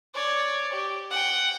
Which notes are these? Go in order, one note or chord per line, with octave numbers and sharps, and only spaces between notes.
C#5 D5
G4
F#5 G5